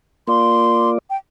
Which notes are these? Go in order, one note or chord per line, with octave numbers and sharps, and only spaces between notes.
A#3 F4 D5 C6
G5